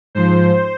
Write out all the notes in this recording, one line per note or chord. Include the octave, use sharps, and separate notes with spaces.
G#2 F3 C5